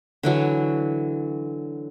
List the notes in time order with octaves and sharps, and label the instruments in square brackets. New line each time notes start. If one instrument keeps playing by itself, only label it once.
[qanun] D3 E3 F#3